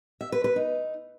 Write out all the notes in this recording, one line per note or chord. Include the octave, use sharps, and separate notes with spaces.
E5
B4
B4
D#4